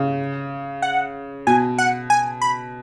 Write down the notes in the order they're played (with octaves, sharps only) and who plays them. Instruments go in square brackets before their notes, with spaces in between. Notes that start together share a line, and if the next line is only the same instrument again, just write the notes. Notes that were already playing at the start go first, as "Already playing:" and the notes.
Already playing: [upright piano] C#3
[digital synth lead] F#5
[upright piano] B2 [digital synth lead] G#5
[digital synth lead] F#5
G#5
B5